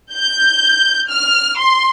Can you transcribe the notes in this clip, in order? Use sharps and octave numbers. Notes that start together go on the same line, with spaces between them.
G6
F6
C6